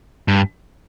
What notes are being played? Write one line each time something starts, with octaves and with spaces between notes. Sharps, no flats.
G2